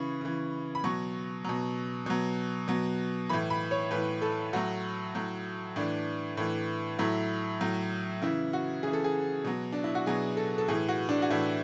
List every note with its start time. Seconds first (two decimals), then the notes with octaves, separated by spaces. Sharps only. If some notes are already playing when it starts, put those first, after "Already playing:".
Already playing: C#3 E3 B5 C#6
0.21 C#3 E3
0.75 B5
0.84 B2 F#3 C#6
1.44 B2 F#3
2.06 B2 F#3
2.68 B2 F#3
3.29 A2 E3 B5
3.50 B5
3.71 C#5
3.91 A2 E3 B4
4.22 A4
4.53 A2 F#3 F#4
5.15 A2 F#3
5.76 A2 E3 D4
6.37 A2 E3
6.99 A2 F#3 E4
7.61 A2 F#3
8.22 C#3 E3 E4
8.53 F#4
8.83 C#3 E3 G#4
8.93 A4
9.04 G#4
9.44 B2 F#3
9.72 D4
9.84 E4
9.95 F#4
10.06 B2 F#3 G#4
10.37 A4
10.58 A4
10.68 A2 E3 G#4
10.89 F#4
11.09 D4
11.22 F#4
11.30 A2 E3 E4